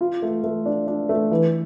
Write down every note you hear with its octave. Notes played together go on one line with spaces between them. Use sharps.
F4
A3
A3
D4
D4
A3
E3